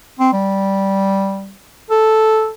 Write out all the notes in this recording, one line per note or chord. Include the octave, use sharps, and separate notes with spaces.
C4
G3
A4